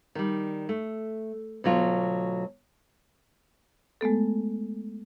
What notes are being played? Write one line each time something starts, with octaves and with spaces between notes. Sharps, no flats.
D#3 G3
A3
D2 B2 F#3 F4
G#3 A3 B3 A4